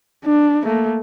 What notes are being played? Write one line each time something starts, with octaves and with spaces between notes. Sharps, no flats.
D4
A3 A#3